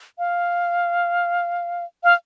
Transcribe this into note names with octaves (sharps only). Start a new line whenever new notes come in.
F5
F5